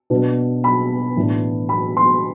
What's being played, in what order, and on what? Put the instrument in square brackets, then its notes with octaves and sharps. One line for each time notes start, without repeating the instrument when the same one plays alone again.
[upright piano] B2 B3 D4
B5
A2 E3 B3 D4
B5
C6